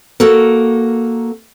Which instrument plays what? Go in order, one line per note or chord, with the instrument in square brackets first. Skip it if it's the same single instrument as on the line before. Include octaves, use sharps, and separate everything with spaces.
[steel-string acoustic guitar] A#3 F#4 A4 A#4